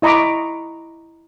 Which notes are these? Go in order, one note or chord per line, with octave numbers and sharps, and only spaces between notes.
E4 D#5 A#5 B5 C#6 D6